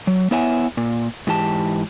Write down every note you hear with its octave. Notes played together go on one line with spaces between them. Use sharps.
F#3
B3 E4 C#5 E5 F#5 G#5
A#2
G#2 E3 G4 A5